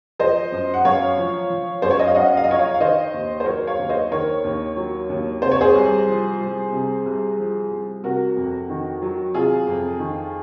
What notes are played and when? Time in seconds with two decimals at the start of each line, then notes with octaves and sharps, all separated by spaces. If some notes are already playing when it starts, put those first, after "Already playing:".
0.19 F3 C5 D#5
0.52 F#2
0.74 F#5
0.85 F#2 C#5 F5
1.18 F3
1.50 F3
1.82 F#2 C5
1.91 C#5
1.99 D#5
2.07 F5
2.15 F#2 D#5 F#5
2.37 F5
2.44 D#5
2.47 F3 C#5 F5
2.59 C#5 F5
2.74 F5
2.80 D#3 C5 D#5
3.14 D#2
3.40 C5
3.46 F#3 A#4 C#5
3.67 C#5 F5
3.79 D#2
3.89 C5 D#5
4.11 D#3 A#4 C#5
4.44 D#2
4.77 F#3
5.10 D#2
5.42 C3 C5
5.51 C#5
5.61 G#4 C5
5.75 C2
6.08 F3
6.40 C2
6.72 C3
7.06 C2
7.39 F3
7.71 C2
8.04 C3 F#4 A#4
8.37 F2
8.69 D#3
9.02 F#3
9.34 C3 F4 G#4
9.67 F2
10.00 D#3